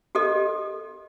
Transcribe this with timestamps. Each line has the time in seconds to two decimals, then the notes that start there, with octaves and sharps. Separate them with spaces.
0.15 G4 A4 A#4 D#5